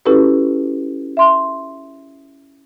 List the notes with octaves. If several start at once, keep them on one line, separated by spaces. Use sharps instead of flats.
C#4 E4 F#4 G4 A4 B4
E5 C6